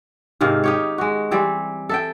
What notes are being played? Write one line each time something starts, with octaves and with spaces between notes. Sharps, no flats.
G#2 C3 D#3 F5
D#4 G4 C#5
G#3 F#4
E3 G3 C4
A4 E5 G5